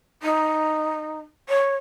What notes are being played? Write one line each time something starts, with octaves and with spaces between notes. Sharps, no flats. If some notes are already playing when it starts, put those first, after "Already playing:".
D#4
C#5